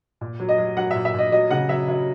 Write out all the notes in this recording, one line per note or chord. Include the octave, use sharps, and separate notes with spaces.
A#2
F#3
D#5
F#3
F#3 F#5
A#2 E5
E5
A#2 D#5
F#3 D#5
C#3 F#5
F#3 E5
F#3 E5